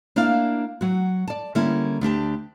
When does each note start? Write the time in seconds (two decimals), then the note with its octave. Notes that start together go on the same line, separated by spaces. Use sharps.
0.16 A#3 D4 E4 D5 F5
0.81 F#3 F#4
1.28 D5 A5
1.55 D3 G3 A#3 C#4 E4
2.01 D2 D4 G4 A5